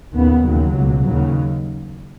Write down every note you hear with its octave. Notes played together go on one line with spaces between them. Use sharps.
D#2 C#3 B3
D#2 C#3 F#3
C#2 B2
D#2 C#3 F#3